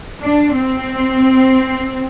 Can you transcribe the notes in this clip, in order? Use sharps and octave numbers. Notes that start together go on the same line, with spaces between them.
D4
C4